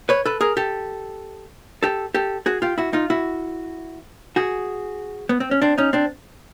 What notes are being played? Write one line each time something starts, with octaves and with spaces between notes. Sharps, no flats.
B4 C#5
A4 B4
G#4 A#4
G4 A4
G4 A4
G4 A4
F#4 G#4
F4 G4
E4 F#4
D#4 F4
E4 F#4
F#4 G#4
B3
C4
C#4
C4 D4
C#4 D#4
C4 D4